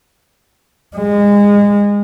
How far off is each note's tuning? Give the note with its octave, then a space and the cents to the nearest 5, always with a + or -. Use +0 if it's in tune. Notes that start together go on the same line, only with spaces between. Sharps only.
G#3 -25